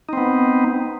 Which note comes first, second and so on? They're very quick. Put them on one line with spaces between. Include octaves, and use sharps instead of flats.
D#4 C4 B3